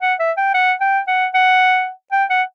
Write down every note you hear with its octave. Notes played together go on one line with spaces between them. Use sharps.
F#5
E5
G5
F#5
G5
F#5
F#5
G5
F#5